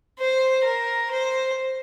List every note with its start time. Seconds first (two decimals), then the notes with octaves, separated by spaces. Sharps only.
0.19 C5
0.64 A#4
1.11 C5